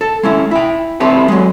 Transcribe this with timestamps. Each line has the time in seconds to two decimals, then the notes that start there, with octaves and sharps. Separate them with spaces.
0.01 A4
0.23 G#3 C#4 E4
0.51 E4 G5
1.00 C4 E4 G4 A4 B4
1.28 F#3 G#3